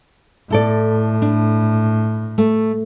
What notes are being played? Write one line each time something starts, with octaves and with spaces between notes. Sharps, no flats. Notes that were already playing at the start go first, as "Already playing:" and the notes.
A2 E4 A4 D5
D4
A3